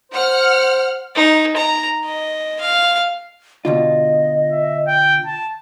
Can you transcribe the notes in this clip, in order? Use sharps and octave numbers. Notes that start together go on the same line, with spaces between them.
C5 F#5 F6
D#4
A#5
D#5
F5
B2 D3 F4 D#5
E5
G5
A5